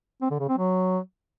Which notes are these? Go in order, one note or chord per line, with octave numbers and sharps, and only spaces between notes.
C4
D3
C#3
C4
F#3